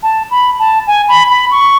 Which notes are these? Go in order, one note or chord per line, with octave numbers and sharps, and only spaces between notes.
A5
B5
A5
G#5
B5
B5
C#6